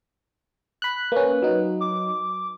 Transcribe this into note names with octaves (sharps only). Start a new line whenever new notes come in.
B5 F#6
A#3 C#4 B4
F#3 D#4
D6